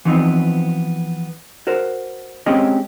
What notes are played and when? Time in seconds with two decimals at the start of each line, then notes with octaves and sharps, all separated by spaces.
0.05 E3 F3 B3 C4 D#4
1.67 F#4 A#4 C5
2.46 G#3 C4 C#4 G4 G#4 D#5